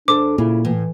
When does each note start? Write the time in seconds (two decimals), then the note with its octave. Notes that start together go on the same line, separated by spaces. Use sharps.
0.08 E2 D4 A4 C5 D6
0.38 A#2 C#3 E4
0.65 A2 E3